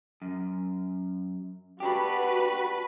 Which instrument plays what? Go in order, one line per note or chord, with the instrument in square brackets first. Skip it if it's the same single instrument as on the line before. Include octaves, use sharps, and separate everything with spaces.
[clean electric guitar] F#2
[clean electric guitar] D4 G4 [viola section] F#4 B5 [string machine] B4